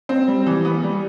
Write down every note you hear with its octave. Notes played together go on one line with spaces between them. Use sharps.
C4
G3
E3
B3
G3